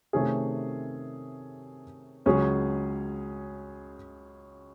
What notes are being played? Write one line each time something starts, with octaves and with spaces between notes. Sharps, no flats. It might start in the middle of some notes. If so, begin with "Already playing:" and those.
C3 D#3 A3 C#4 G#4
C#2 C#3 F#3 C#4 G#4